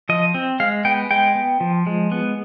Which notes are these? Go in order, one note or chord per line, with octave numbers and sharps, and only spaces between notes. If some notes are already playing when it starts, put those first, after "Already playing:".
F3 D#5
C4
G#3 F5
B3 G5
G#3 G5
B3
F3
G#3
B3